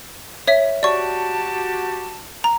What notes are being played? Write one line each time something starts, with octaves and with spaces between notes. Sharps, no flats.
C#5 E5 B6
F#4 G4 D5 A5 C#6
A#5